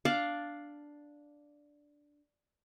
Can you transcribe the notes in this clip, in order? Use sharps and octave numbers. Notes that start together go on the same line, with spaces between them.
D4 F5 A5 D6